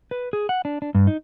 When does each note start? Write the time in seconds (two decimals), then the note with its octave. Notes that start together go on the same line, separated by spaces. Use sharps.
0.11 B4
0.33 G#4
0.49 F#5
0.65 D4
0.82 D4
0.95 G2
1.07 D#4